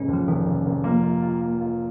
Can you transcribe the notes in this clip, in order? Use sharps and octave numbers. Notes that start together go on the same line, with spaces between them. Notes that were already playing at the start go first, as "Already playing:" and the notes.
Already playing: F1 G#2 C#3 C#4
D#2
F3
F1 D#3
F1
F1
F3 A#3
F4
F4
A#3
F4